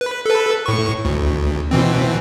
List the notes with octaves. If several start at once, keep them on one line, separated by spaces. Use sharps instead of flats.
B4
A4 B4
A2 C#6
D2
B2 E3 C4